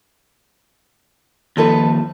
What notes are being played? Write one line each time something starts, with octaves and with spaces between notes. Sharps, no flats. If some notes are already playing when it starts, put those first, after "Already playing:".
D#2 F3 D#4 A4 B4